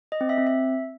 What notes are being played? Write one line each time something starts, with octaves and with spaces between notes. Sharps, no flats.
D#5
C4
E5
C4
E5